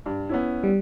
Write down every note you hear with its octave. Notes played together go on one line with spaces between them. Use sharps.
G2
B3 C#4 E4
G3